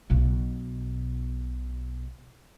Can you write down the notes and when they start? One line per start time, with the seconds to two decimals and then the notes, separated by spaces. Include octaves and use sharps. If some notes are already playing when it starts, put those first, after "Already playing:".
0.10 B1 B2